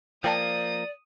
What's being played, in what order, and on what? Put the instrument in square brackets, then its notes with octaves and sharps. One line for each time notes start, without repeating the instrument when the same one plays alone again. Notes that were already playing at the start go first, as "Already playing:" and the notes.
[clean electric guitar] F3 A#3 [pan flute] D5 [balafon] G5 A5 [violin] D#6